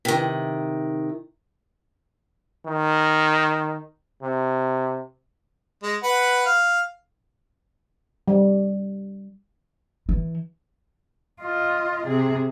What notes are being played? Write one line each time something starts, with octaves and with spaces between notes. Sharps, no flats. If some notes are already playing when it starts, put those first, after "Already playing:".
C3 D#3
D#3
C3
G#3
B4 F#5
F5
G3
E3
F4 D#5
C3 G#4